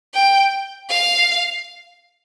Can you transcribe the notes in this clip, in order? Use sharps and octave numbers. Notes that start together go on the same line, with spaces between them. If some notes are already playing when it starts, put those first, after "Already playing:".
G5
F5